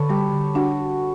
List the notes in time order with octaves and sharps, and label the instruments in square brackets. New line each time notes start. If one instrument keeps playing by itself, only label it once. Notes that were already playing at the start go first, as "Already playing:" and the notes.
Already playing: [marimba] D3 [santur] A4 B4 C#5
[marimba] G3 [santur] G4
[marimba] D3
[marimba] D4 [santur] F#4